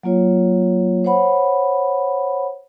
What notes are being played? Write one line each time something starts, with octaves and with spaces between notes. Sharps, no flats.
F#3 A#3 F4 C#5
C5 C#5 F#5 B5